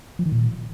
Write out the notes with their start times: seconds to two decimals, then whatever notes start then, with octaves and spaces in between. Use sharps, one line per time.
0.19 F3
0.26 D#3
0.32 A#2